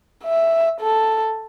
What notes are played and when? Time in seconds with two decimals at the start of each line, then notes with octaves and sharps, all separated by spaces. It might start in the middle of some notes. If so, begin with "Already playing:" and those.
0.24 E5
0.80 A4